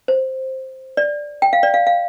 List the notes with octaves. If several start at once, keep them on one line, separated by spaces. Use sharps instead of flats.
C5
D5
G5
F5
D5
F5
F5